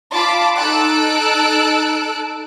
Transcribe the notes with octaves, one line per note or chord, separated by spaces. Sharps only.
F4 A5 B5 D6
D#4 A4 A5 E6 F#6 D7